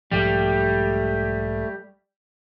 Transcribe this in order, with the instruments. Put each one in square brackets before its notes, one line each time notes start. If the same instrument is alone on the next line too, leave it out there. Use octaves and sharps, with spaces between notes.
[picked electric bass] B1 G#2 F3 [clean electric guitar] G3 [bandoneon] A3